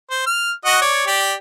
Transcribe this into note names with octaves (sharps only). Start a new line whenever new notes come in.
C5
F6
F#4 D#5 F#5
C#5 D5
G4 D5